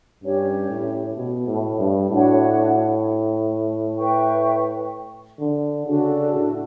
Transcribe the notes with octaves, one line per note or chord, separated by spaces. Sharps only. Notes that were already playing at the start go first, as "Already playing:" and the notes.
G2 C#4 G4 C#5
A2
B2
A2
G2
A2 D4 F#4 C#5 F#5
B4 E5 G5 C#6
D3
C#3 D4 F#4 A4
A2